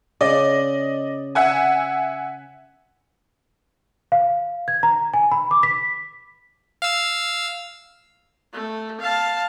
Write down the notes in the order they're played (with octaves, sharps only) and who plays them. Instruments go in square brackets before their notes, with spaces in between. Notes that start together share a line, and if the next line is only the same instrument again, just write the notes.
[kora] C#3 [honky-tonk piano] D5 D#5
[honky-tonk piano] E5 F#5 G#5
[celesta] F5
G#6
A#5
G#5
B5
D6
B6
[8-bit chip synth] F5 E6
[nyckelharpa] A3
F5 A5